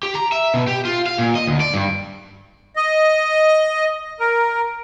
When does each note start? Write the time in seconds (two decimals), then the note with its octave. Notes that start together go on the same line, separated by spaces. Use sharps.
0.03 G4
0.15 A#5
0.32 E5
0.54 B2
0.68 G4
0.85 F4
1.06 F5
1.18 A#2
1.35 D#5
1.47 D2
1.60 D5
1.74 G2
2.76 D#5
4.20 A#4